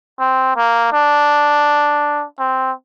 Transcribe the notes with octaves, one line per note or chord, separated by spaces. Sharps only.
C4
A#3
D4
C4